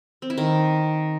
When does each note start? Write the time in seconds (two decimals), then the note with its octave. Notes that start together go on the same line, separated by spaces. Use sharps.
0.22 C4
0.30 E4
0.38 D#3